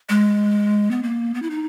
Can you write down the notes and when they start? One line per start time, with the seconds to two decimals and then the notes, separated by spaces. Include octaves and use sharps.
0.09 G#3
0.91 B3
1.03 A#3
1.34 B3
1.42 E4
1.50 D#4